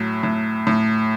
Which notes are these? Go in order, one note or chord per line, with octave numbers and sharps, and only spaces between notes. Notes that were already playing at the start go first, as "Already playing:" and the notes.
Already playing: A2 F#3
A2
A2